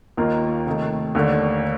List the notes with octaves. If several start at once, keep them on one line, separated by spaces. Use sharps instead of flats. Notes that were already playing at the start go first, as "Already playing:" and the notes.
D#2 D#3 A#3 F4 A#4
C3 D#3 A3
D#2 D3 A3 D4